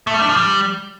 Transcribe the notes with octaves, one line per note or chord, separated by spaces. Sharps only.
A3
G3
D4
F3
G3